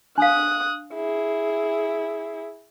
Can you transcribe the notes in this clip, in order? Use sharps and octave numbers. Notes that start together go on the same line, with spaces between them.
D4 F5 D#6 F#6
E4 G#4